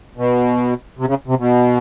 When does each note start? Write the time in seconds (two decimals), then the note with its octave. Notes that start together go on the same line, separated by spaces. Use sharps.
0.17 B2
0.98 C3
1.07 C#3
1.28 C3
1.39 B2